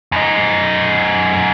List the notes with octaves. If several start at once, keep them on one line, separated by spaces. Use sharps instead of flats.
F#2 D#4